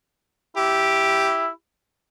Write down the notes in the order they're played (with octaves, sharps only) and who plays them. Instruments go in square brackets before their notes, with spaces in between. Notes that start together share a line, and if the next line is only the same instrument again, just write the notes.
[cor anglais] E4 [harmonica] G4